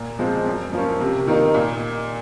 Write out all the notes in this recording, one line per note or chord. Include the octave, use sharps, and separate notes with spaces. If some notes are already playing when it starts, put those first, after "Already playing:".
Already playing: A#2
F3 G#3 C4
F#2
F3 A#3 C#4
C3
D#3 A#3 D#4
A#2